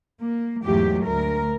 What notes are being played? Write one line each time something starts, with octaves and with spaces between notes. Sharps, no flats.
A#3
E2 G#2 F#3 A3 G4
D2 A#4